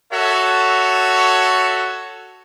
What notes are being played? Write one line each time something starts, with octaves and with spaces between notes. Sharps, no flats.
F#4 A4 C#5 E5